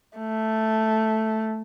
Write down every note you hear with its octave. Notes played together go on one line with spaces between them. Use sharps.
A3